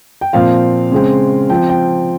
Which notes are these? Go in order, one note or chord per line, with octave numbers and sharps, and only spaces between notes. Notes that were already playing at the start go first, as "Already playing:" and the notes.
G5
A#2 F3 C4 F5
C#3 G#3 C4
F3 C4 G5
G5